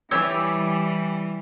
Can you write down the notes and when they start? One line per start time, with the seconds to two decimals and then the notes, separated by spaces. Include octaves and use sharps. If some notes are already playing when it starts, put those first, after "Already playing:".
0.11 E3 G3 G4 C#5 E6